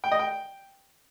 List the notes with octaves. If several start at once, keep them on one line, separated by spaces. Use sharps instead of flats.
G5
D#5
G5